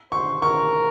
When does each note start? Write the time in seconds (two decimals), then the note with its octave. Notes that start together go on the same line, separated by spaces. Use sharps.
0.12 C5 C#6
0.42 A#4 C#6